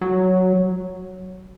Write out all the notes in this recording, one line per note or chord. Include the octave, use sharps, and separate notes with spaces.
F#3